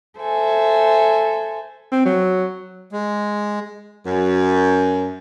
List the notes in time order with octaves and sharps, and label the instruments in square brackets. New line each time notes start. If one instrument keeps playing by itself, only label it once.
[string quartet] A4 C5 E5 G#5
[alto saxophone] C4
F#3
[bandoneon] G#3
[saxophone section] F#2